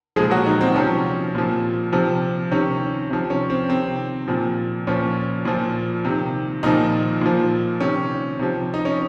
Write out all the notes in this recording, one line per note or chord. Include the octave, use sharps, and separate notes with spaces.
A#2 F3 G#3 G#4
F#3 F#4
D#3 D#4
C4
C3 F3 C#4
A#2 F3
C3 F3
C3 D#3 C#4
C3 F3
C#4
C4
C3 D#3 C4
A#2 F3
A#2 F3 C#4
A#2 F3
C3 D#3
A#2 D#3 F3 D#4
A#2 F3
C3 D#3 C#4
C3 F3
D#4
C#4